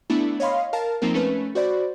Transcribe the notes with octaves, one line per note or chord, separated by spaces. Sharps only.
A3 B3 D4 E4 A4
C#5 D#5 F5 B5 C6
A#4 F5 A5
F3 A#3 C4 D#4 A#4
A3 C#4 B4
F#4 C5 D5 B5